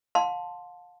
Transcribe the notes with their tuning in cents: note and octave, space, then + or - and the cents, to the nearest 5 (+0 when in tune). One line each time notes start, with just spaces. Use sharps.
F5 +35 A5 +0 C6 -5